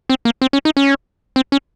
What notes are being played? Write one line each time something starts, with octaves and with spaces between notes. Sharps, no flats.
C4
A#3
C4
C#4
D#4
C#4
C4
C#4